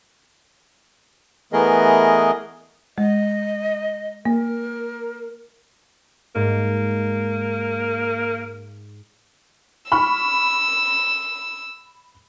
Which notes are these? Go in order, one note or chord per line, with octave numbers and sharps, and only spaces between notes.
E3 A3 B3 G#4 A#4 D#5
G#3 D#5
A#3 A#4
G#2 A#3
B5 C#6 E6 F6